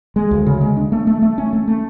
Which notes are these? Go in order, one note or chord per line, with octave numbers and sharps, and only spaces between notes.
G#3
D2
C#3
G#3
D4
A3
A3
A3
C#4
A3
A3